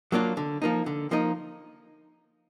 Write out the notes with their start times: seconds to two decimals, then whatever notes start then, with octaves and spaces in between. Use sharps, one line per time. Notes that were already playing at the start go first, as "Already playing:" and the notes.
0.12 F#3 A#3 D4 F4
0.37 D3
0.62 F3 A#3 D#4
0.86 D3
1.11 F3 A#3 D#4